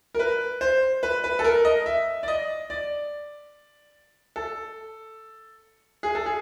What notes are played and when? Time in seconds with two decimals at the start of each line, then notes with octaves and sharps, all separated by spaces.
0.15 A#4
0.19 B4
0.61 C5
1.03 B4
1.24 B4
1.39 A4
1.44 A#4
1.65 D#5
1.86 E5
2.23 D5
2.28 D#5
2.70 D5
4.36 A4
6.03 G#4
6.15 A4
6.26 G#4